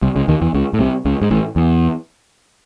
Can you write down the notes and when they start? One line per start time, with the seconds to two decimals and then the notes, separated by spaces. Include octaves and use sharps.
0.02 C2 C3
0.16 C#2 C#3
0.28 D#2 D#3
0.41 E2 E3
0.54 C#2 C#3
0.73 A2
0.79 C2 C3
1.05 C#2 C#3
1.22 G#2
1.30 A1 A2
1.56 E2